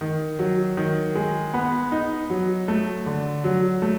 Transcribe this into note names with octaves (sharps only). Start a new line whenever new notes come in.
D#3
F#3
D#3
G#3
B3
D#4
F#3
A3
D3
F#3
A3